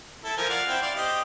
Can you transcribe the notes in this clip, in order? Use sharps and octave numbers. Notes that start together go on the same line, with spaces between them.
E4 A4
F3 A#4 G#5
D5 F5 F#5
C4 E4 G5
D5 F5
C4 G4 D#5